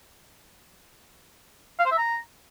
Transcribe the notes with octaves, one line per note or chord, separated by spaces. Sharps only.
F5
C5
E5
A#5